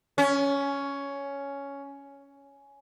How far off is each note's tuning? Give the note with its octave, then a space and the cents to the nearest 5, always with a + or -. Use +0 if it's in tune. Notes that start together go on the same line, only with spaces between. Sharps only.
C#4 +10